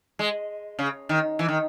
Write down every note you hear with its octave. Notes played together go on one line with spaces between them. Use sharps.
G#3
C#3
D#3
E3
D#3